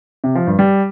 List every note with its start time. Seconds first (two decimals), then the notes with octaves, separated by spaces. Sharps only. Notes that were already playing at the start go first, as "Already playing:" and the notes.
0.24 C3
0.35 F3
0.47 G2
0.59 G3